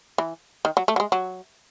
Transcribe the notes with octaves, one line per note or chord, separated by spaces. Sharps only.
E3
D#3
F#3
A3
F#3
G#3
F#3